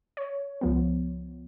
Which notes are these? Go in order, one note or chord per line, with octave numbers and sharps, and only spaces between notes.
C#5
C#2 F3 B3